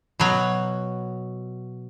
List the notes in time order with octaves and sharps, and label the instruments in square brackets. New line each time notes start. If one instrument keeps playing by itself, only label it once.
[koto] B2 F#3